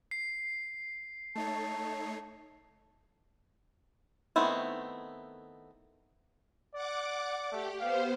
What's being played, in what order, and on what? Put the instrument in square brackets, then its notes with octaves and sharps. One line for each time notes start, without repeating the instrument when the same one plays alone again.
[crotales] C7
[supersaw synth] A3 D#4 C#5 [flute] A5
[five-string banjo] D#3 A3 B3 C4 E4
[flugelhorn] D5 [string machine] F#5 D6
[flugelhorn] A3 [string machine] G4
[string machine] B3 C5 [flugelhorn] F5